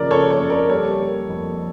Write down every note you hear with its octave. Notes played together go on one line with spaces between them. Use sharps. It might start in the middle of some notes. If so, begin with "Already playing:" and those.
Already playing: C#3 F3 A#4 D5
C#3 A4 C#5
A4 C#5
F2
A#4 D5
G3 A4 C#5
A#3
F2